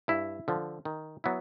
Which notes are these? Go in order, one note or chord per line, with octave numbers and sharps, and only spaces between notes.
G2 E4
D3 F3
D#3
F#3 B3 E4